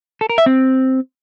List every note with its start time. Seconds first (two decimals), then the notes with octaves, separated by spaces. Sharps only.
0.21 A4
0.30 A#4
0.38 E5
0.46 C4